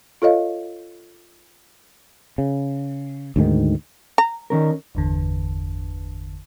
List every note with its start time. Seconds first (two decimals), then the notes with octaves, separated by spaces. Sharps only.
0.22 F4 A4 C#5 D#5 F5
2.38 C#3
3.36 D2 G#2 D#3
4.18 A#5
4.50 D#3 C#4 A#4
4.95 G1 E2 D3